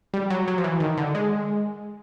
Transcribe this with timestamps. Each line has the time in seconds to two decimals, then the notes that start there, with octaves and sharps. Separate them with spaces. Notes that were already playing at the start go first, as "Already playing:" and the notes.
0.13 G3
0.30 F#3
0.48 F#3
0.58 F3
0.64 E3
0.80 D#3
0.97 D3
1.15 G#3